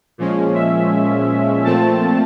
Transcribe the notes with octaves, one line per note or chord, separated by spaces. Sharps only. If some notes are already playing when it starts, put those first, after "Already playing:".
A#2 F3 G#3 C#4
E5
A#2 F3 A3 C4 A5